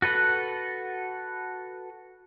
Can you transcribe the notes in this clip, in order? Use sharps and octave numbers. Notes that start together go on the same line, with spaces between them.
F#4 A4 B4 F#5